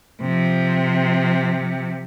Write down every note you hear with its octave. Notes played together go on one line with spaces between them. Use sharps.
C3 F3